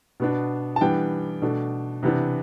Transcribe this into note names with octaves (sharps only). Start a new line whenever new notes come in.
B2 B3 D4
A5
E3 G3 B3 D4 G5
B2 A3 D4
C3 E3 B3 D4